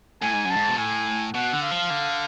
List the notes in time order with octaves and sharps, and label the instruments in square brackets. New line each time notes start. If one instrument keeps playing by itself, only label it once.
[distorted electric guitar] A2 [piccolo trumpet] G#5
[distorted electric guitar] G#2
F#2
[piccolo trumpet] A5
[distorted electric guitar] G#2
B2
[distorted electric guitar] A2 [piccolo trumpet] G#5
[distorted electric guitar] B2 [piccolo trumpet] F#5
[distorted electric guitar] D3
[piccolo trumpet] F5
[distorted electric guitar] F3
D3